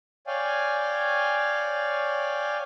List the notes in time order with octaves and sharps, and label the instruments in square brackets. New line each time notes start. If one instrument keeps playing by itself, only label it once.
[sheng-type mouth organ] C#5 D5 F5 G5 G#5